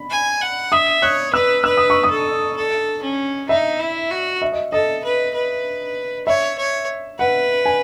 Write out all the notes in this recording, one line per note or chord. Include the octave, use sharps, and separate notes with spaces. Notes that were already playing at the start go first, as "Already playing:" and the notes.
Already playing: B5
G#5
F#5
E5 D#6
C#5 F#6
B4 E6
B4 E6
D#6
C#6
D#6
A4
A4
C#4
D#4 E5
E4
F#4
E5
D#5
A4 D#5
B4
B4
C#5 E5
C#5
B4 F#5
G#5